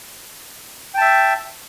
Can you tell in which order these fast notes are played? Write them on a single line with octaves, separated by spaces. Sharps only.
G5 A5 E5